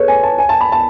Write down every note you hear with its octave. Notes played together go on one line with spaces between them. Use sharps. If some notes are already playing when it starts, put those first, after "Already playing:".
Already playing: G#4 A4 B4 C#5
G#5
A5
G#5
A5
B5
A5